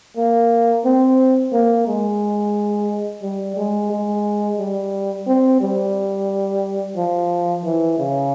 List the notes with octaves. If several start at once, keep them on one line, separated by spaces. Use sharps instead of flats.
A#3
C4
A#3
G#3
G3
G#3
G#3
G3
C4
G3
F3
E3
C#3